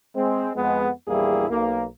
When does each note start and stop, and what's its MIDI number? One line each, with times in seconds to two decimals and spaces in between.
0.16 0.51 56
0.16 0.51 60
0.56 0.88 41
0.56 0.88 56
0.56 0.88 59
1.08 1.47 34
1.08 1.47 40
1.08 1.47 55
1.08 1.47 58
1.08 1.47 64
1.08 1.47 68
1.50 1.85 35
1.50 1.85 58